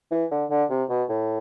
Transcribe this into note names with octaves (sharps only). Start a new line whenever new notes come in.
E3
D3
D3
C3
B2
A2